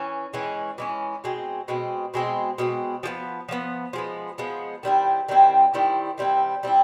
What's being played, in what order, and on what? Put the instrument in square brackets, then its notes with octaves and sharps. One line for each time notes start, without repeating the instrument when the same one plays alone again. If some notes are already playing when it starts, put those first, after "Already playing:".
Already playing: [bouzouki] E3 C#4
E3 G#3 C#4
E3 G#3 C#4
B2 G#3 C4
B2 G#3 C4
B2 G#3 C4
B2 G#3 C4
F3 G#3 B3
F3 G#3 B3
F3 G#3 B3
F3 G#3 B3
D#3 G3 C4 E4
D#3 G3 C4 E4
D#3 G3 C4 E4
D#3 G3 C4 E4
G3 C4 E4